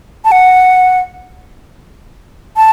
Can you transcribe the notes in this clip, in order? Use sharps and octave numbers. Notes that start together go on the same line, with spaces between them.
A5
F#5
A5